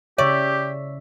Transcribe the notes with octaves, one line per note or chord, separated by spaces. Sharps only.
C#3 G4 C#5 D5 E5 C#6